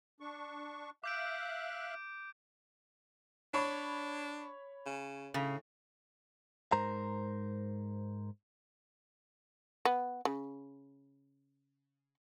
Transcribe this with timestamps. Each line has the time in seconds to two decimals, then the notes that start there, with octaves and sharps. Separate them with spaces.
0.20 D4 C#6
1.04 E5 F5 D6 F#6 G6 D7
3.54 D4 C#5 B5 C#6
4.86 C#3
5.34 A2 C#3
6.72 G#2 A#4 C5 A#5
9.85 B3
10.25 C#3